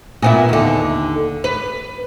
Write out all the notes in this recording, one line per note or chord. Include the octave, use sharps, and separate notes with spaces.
A#2 B3 E4
D#2 D3
B4